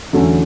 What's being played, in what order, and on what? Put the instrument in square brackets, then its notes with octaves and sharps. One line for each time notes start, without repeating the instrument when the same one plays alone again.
[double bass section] E2 E3 [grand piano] D3 F#3 A3 C#4